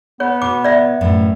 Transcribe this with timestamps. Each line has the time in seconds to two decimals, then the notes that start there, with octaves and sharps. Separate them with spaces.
0.20 B3 C#5
0.42 B2 D6
0.64 D5 E5
1.01 F#2 A2 E3